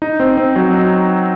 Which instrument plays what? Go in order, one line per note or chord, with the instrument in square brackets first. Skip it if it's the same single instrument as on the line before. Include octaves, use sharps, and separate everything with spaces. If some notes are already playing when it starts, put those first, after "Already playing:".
[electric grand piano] D#4
C4
C4
F#3
D#4